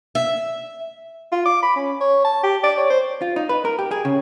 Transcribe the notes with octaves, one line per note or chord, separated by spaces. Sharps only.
E5
F4
D6
B5
C#4
C#5
A5
G4
D5
C#5
C5
F4
D#4
B4
A#4
G4
G#4
C#3